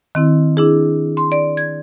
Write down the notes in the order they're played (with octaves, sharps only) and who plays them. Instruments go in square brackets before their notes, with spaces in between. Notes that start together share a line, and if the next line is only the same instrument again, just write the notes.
[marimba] D#3 C4 E4
D4 E4 G#4
C6
D5
G#6